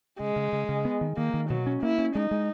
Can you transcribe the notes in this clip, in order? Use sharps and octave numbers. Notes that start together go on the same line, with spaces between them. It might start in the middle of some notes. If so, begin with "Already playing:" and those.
C#3 G#3
C#3
C#3
C#3
B3
D#3
D#3 A#3
D#3
B2 F#3
C#4
A#3 E4
C#4
G#3 D#4
G#3